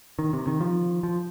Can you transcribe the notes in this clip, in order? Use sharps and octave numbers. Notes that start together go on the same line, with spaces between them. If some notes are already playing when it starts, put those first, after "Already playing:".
D#3
C3
D#3
F3
F3